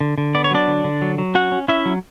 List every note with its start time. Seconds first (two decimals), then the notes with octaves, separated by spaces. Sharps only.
0.01 D3
0.18 D3
0.35 B3 D5
0.44 C#5
0.51 F#3 D4 D5
0.68 D3
0.84 D3
1.02 F#3
1.18 F#3
1.35 C#4 F#4 F#5
1.52 C#4
1.68 C#4 E4 E5
1.86 F#3